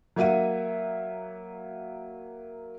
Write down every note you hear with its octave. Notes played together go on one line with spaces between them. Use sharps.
F#3 A#3 E5 F#5 D#7